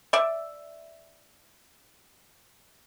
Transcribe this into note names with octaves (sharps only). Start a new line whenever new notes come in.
D5 E5